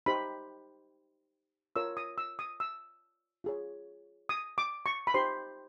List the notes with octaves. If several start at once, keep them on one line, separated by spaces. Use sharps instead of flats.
D#4 G4 C5 B5
F4 A#4 C#5 E6
D#6
E6
D#6
E6
F4 G#4 C#5
D#6
D6
C#6
B5
D#4 G4 C5 C6